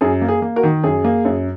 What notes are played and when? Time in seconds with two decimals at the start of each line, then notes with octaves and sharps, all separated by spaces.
0.01 F#2 G#4
0.22 A#3
0.28 G#4
0.42 A#3
0.56 F#4 A#4
0.63 D#3
0.84 F#2 G#4
1.04 A#3
1.25 F#2